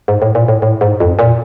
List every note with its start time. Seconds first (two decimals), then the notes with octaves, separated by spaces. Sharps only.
0.08 G#2
0.22 A2
0.35 A#2
0.48 A2
0.62 A2
0.81 G#2
1.00 F2
1.19 A#2